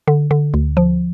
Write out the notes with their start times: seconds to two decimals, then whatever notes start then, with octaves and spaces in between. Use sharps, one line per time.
0.07 D3
0.31 D3
0.54 D2
0.77 F3